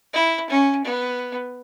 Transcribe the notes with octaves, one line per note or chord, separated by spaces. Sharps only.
E4
C#4
B3